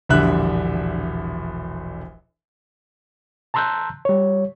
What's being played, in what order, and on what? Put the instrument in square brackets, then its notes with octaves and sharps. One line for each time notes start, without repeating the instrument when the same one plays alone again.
[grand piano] E1 A#1 D3 G3 E5 F#6
[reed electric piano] A5 A#5 C6 E6 F#6 G6
G3 C#5